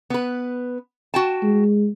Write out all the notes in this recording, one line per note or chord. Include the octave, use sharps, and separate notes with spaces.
B3 B4
F#4 G5 A5
G#3